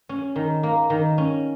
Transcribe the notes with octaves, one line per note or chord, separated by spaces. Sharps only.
C#4
D#3
A#3
D#3
C#4